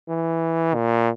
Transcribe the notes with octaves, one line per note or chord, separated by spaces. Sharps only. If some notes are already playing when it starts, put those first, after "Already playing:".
E3
A#2